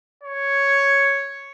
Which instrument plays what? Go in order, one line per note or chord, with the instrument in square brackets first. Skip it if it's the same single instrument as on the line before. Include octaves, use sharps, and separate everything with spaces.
[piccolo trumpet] C#5